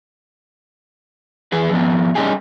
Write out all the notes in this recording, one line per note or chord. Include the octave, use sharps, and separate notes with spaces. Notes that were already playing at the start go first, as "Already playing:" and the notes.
E3 G#4 B4
F3 B3 C4
G3 C4 C#4 D#4 G4 G#4